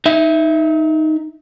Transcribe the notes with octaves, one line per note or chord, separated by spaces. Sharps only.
D#4 E5